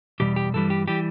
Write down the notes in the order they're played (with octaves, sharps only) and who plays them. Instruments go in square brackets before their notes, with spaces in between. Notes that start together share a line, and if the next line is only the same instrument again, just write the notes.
[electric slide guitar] E2 B2 G3 G4
G4
G2 E3 G3 A4
G4
E3 G3 G4